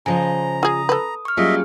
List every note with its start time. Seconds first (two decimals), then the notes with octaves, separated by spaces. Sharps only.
0.06 C#3 F3 C5 D#5 G#5 A#5
0.63 F4 G#4 D#6
0.89 A4 B4
1.25 C#6 F6
1.37 F#3 G3 A#3 C#4 F4 G#4 D#5 E5